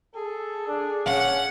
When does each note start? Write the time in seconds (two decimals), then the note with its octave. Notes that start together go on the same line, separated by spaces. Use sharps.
0.15 G#4 A4
0.68 D4
1.06 D#1 C#4 F#5